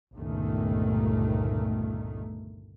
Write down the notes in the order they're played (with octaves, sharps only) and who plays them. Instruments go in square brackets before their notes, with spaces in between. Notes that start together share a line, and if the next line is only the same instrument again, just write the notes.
[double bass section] G1 C#2 A#2 D#3 A3